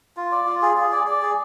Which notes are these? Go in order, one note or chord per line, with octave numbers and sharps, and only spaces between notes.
F4
D5
F4
G#4
G#4
D5
D5
G#4